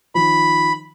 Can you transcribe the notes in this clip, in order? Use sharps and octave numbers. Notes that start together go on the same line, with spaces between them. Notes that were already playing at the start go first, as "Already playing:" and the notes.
D#3 F3 B5